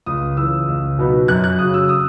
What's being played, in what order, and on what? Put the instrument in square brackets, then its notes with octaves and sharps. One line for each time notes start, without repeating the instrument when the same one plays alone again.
[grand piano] C#2 D#6
C#3 E3 E6
C#2
B2 F#3 B3 D#4
F#2 F#6
F#6
C#3 F#3 D#6
E6
D#6